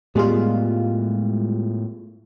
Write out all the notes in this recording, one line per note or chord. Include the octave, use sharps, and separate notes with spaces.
A2 G3 G#3 B3 F4